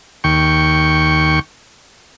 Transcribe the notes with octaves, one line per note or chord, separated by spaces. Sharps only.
D#2 G5 C#6